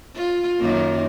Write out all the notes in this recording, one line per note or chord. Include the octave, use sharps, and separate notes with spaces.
F4
F#2 D#3 A#3